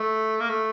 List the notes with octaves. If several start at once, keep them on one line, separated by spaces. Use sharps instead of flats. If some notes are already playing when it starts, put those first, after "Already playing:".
Already playing: A3
A#3
A3